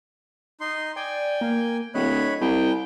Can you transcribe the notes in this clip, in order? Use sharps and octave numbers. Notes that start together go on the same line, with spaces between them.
D#4 C6
D5 G5 G#5
A#3
D1 C#5 D#5 B5 F#6
C2 G5